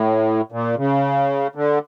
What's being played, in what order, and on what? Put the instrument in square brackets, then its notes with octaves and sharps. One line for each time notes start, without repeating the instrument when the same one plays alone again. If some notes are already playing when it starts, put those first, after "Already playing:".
Already playing: [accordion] A2
A#2
C#3
D3